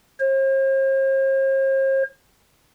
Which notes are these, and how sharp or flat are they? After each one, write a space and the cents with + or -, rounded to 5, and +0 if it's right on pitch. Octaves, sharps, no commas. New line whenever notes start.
C5 +45